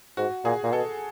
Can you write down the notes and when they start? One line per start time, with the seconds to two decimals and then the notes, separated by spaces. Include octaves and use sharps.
0.17 G#2 F#4
0.44 A#2 G#4
0.63 A#2
0.73 B2 A4